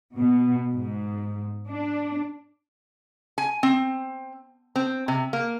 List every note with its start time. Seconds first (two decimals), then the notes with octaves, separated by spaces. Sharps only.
0.14 B2
0.73 G#2
1.70 D4
3.38 G#5
3.63 C4
4.76 C4
5.08 C3
5.33 A#3